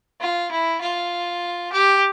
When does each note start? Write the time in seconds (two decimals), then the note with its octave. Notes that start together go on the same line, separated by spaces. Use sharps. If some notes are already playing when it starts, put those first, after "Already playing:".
0.20 F4
0.51 E4
0.81 F4
1.72 G4